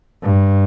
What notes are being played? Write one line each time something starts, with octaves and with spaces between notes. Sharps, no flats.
G2